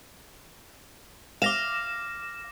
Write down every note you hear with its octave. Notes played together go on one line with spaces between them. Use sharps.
F5 D6 A#6 E7